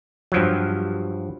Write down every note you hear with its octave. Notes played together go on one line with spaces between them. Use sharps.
G2 F3 F#3